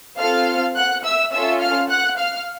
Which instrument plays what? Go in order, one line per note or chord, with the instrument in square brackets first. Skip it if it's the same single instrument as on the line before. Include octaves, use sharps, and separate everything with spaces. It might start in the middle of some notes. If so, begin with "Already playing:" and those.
[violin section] C4 F4 A4 F5 F6
F#5 F#6
E5 E6
C#4 F4 A4 E5 E6
F5 F6
F#5 F#6
F5 F6